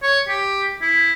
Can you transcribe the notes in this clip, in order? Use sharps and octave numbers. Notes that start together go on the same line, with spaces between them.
C#5
G4
E4